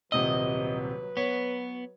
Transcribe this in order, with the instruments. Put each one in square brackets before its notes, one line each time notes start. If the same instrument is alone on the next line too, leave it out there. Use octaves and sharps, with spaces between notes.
[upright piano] D#1 C3 D#6 [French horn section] F#3 B4 [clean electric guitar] D#5
[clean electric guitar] B3 [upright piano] C#5